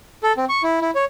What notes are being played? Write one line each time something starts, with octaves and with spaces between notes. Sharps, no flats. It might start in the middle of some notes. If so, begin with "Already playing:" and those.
A4
C4
C#6
E4
E4
C#5